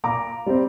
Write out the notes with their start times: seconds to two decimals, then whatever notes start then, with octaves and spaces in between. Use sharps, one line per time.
0.04 A#2 A#5 D6
0.46 G3 C4